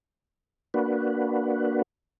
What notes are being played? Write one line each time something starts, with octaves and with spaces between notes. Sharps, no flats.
A#3 D4 F#4 B4